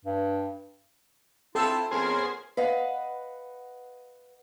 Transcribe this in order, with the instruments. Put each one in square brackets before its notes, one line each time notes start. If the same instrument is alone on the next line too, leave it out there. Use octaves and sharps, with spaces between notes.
[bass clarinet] G2
[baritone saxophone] C4 [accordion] E4 F4 [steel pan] A4 E6
[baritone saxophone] F2 [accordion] B3 C#4 A#4 [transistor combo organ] G#4 C5
[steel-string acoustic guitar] B4 D#5 F5 F#5